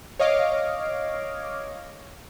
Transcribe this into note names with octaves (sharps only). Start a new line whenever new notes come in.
C#5 D#5 F5 D6